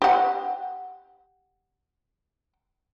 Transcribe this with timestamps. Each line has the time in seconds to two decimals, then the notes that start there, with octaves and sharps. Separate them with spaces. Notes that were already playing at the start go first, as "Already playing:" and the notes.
0.02 G4 F#5